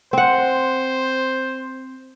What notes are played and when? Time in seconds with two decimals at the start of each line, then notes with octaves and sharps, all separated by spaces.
0.13 C4 C5 F#5